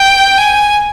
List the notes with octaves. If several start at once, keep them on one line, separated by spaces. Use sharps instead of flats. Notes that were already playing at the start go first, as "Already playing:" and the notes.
Already playing: G5
G#5